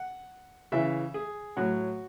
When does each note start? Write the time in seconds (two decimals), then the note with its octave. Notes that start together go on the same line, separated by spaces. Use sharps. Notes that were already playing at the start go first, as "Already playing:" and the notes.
Already playing: F#5
0.72 C#3 E3 E5
1.14 G#4
1.57 A2 F#3 F#4